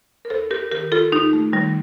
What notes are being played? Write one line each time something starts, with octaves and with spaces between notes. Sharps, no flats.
A#4
D#2 A4 C5
G4 A#4
D#3 G4 A#4
F4 A4
D#2 D#4 G4
A3
D#3 G3